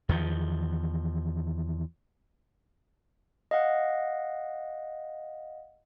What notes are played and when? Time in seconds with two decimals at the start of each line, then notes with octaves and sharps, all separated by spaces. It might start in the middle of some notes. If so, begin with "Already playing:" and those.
0.09 E2 D#3 F3
3.51 D#5 F5 F#5